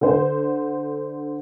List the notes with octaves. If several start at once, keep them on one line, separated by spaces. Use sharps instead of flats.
D3 C5